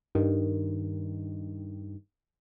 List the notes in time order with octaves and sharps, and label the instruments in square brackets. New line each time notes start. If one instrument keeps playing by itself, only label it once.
[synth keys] G2 D#3